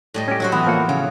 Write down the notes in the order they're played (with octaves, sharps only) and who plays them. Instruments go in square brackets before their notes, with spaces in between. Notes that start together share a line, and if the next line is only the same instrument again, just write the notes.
[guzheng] A2 G3 D#5
[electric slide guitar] C#4 G4
[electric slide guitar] F#3 [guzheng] E4 F#4 C5
[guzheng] E3 [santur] B3
[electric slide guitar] F3 A#3 F#4
[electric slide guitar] C#3 [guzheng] F#3